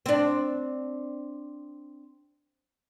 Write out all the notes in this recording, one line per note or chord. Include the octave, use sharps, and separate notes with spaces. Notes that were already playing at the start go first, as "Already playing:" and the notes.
C4 D4